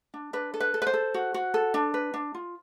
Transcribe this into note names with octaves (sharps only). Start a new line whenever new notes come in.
D4
D4 B4
A4
B4
A4
B4
C5
A4
F#4
F#4
A4
D4
B4
D4
F4